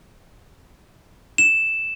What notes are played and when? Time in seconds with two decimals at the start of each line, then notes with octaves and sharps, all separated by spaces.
1.38 E7